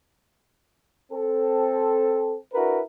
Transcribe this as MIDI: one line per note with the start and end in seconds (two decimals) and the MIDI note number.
1.12 2.35 60
1.12 2.35 69
2.53 2.81 62
2.53 2.81 64
2.53 2.81 66
2.53 2.81 70
2.53 2.81 71